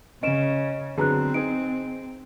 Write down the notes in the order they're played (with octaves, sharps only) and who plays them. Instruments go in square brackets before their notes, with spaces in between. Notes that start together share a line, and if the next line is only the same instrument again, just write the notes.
[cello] C#3 [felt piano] C#4 [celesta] D#5 D7 E7
[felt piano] D3 F#3 B3 [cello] C4 [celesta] G#4 A#5 F#6
[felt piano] D#4 G#4 [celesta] D7